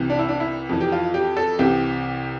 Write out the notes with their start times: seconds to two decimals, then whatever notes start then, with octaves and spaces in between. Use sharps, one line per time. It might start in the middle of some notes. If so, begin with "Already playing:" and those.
Already playing: C2 C3 E3
0.10 D4
0.19 E4
0.28 D4
0.40 E4
0.69 F2 E3
0.81 G4
0.92 F4
1.14 G4
1.37 A4
1.59 C2 C3 E3 G4